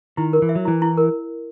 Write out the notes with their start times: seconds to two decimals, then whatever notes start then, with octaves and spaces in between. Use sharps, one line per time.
0.17 D#3 E4
0.33 A#4
0.42 E3
0.49 E5
0.55 F#3
0.65 E3 E4
0.82 E4
0.97 A#4